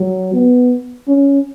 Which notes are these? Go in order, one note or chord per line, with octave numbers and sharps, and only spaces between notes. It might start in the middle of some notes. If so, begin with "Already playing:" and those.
Already playing: F#3
B3
C#4